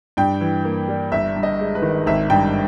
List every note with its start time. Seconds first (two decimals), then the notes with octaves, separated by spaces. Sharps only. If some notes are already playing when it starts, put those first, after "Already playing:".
0.17 G2 G5
0.41 E3
0.65 A#3
0.88 G3
1.12 G1 E5
1.36 G2
1.43 D#5
1.59 G#3
1.75 B4
1.82 D#3
2.06 G#1 E5
2.30 G2 G5